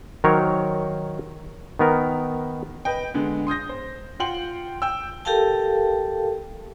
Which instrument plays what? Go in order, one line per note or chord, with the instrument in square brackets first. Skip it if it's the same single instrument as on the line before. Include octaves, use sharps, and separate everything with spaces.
[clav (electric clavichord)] D#3 F#3 A#4 C5 C#5
D#3 B3 A#4
[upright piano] B4 D#5 G5
D3 G#3 B3
C6 D#6 G6 A#6
C5
F4 F#5 G5 C6 F#7
G5 E6
[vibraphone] G4 A4 A#4 F5 G5 A5